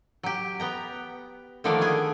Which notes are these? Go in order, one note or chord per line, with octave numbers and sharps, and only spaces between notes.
F#3 G4
B3 G5 A#5
D3 D#3 F3 A3 A#3 D4
B3 G#4 G#5